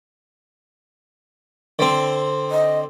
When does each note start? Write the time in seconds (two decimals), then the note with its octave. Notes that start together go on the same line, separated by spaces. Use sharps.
1.79 D3 C4
2.51 D#5